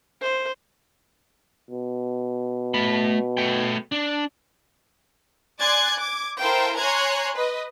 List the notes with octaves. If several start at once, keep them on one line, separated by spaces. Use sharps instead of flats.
C5
B2
A3 B5
A3 G5
D4
D5 G#5 C6 F#6 G#6 A6
D6 G#6
E4 A4 A#4 C5 F5 G5
C#5 G#5 A#5 C6 F#6 G#6
B4 D#5